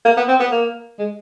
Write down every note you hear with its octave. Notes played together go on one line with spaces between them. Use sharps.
A#3
B3
C4
B3
A#3
G#3